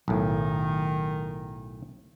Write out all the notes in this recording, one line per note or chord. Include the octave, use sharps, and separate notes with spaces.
B1 A2 D#3